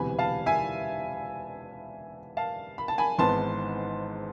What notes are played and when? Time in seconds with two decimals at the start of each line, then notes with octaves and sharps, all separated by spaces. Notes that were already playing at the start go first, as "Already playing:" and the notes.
Already playing: E1 D2 C3 E3 B3 G#5 B5
0.19 F5 A5
0.46 E5 G#5
2.37 F5 A5
2.78 B5
2.88 A5
2.98 G#5 B5
3.18 G#1 G#2 E3 B3 A5 C6